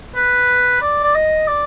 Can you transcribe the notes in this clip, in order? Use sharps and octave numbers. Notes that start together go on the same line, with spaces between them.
B4
D5
D5
D#5
D5